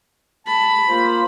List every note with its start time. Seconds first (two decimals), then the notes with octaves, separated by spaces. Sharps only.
0.46 A5 B5
0.88 A#3 F4 C5